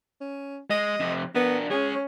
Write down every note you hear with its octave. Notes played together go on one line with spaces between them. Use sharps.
C#4
G#3 D#5
F2 C3
B3 D4 A#4
G#3 C#4 G#4 C#5